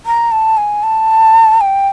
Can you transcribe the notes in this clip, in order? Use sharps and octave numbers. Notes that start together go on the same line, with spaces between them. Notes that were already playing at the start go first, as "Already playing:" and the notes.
A#5
A5
G#5
A5
G5